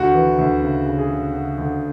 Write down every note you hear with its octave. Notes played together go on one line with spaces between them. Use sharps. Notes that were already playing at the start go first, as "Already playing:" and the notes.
Already playing: D2 F#4
E3
D2
C#3
C#3
G#4
C#3
C#3
D2